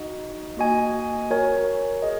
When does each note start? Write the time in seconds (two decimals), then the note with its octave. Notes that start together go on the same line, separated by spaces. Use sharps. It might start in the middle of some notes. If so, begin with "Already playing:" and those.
Already playing: D#4 F#4 D#5
0.57 A#3 F#4 D#5 G#5
1.31 F#4 A#4 C#5 G#5
2.02 G#4 D#5